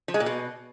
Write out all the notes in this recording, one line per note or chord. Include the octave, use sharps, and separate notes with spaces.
F3
G#3
A#2
B2